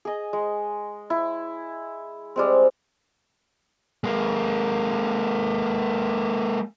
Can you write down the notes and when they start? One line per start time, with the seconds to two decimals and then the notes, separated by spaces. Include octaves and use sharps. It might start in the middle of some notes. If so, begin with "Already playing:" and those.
0.05 G#4 D#5
0.33 G#3
1.10 E4
2.36 G3 G#3 C4
4.04 G#3 A#3